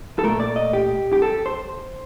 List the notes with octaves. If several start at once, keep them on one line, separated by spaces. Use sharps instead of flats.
A4
A#2 A3 A#4
D5
D#5
G4
G4
A4
C5